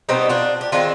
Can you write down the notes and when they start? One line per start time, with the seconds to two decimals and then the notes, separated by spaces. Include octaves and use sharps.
0.09 B2 G3 B3 C4 D#4
0.30 D4 F4
0.61 G4
0.72 D#3 G#3 C4 D4 F4